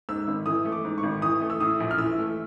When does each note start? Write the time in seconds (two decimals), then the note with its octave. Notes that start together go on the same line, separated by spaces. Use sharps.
0.09 G#2 E6
0.27 G#1
0.46 E3 D#6
0.65 A3
0.72 D6
0.85 G#2
0.98 C#6
1.03 G#1
1.22 E3 D#6
1.41 A3
1.50 E6
1.60 A2 D#6
1.80 A#1
1.91 F6
1.98 E3 E6
2.18 A3